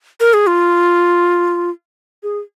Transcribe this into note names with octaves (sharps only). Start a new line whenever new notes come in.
A#4
G#4
F4
G#4